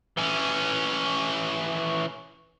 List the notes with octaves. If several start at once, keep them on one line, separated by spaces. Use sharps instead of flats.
E3 C#4